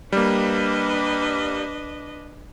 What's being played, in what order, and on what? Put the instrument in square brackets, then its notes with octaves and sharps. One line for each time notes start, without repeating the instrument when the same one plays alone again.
[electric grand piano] G3 A#3 [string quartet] D4 B4 D#5